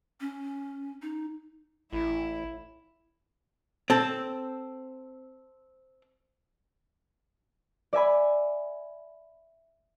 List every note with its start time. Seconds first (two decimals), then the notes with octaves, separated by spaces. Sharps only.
0.21 C#4
1.02 D#4
1.93 A1 E4
3.90 C4 A4
7.93 D5 E5 G#5 B5